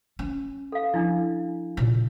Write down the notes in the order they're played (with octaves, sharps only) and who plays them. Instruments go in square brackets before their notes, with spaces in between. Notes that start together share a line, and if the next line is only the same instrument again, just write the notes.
[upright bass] C#4
[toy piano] A4 F5
[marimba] F3 [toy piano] D4 E4
[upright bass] A#2 C#3